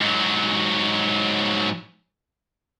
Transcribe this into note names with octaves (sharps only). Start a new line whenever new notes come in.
G#2 F#3